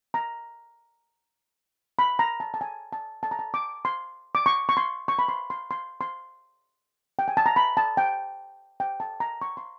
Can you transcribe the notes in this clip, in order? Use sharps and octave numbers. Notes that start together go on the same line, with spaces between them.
A#5
B5
A#5
A5
A5
G#5
A5
A5
A#5
A5
D6
C6
D6
C#6
C#6
C6
C#6
B5
C6
C6
C6
C6
G5
G#5
A5
A#5
B5
A5
G5
G5
A5
A#5
C#6
C6